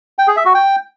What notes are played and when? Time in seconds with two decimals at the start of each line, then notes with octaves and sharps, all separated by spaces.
0.19 G5
0.28 G#4
0.37 E5
0.46 F#4
0.55 G5